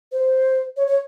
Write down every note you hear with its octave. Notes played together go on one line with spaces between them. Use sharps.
C5
C#5
C#5